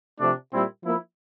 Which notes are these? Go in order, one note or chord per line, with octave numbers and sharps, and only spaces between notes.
C3 F3 A3 D4
A#2 G3 C4 E4
F3 A#3 E4